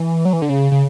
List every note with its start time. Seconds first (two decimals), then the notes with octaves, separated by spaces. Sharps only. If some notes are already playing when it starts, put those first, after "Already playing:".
Already playing: E3
0.25 F#3
0.33 E3
0.42 D3
0.49 C#3
0.72 C#3